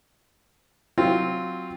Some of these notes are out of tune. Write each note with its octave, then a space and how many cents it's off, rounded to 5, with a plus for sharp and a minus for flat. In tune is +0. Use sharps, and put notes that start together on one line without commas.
F#3 +0 C4 +0 F4 +0